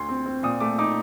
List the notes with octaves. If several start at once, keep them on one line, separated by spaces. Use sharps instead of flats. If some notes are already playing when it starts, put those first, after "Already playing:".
Already playing: D2 C6
C4
C4
A#2 D#6
A3 D6
D#4 D6